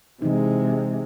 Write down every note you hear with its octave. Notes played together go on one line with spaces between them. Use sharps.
C3 E3 G#3 D#4